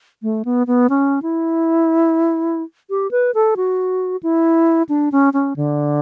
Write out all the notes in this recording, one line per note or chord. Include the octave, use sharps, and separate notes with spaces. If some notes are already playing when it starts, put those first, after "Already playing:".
A3
B3
B3
C#4
E4
G4
B4
A4
F#4
E4
D4
C#4
C#4
D3